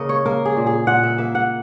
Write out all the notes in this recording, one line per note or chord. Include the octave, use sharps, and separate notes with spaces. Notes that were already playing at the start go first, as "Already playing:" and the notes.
Already playing: C#3 A#3 A#4 D#5
C#5
A#3 A#4
G#4
A#2
G#4
A#2 F#5
E5
A#3 E5
F#5